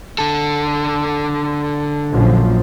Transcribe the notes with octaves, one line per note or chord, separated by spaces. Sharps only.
D3 A4
A#1 F#2 F3